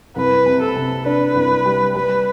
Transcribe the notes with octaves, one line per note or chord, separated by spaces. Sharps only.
C2 B4
C3
A4
C3
D4 B4
C2
G3
G3 B4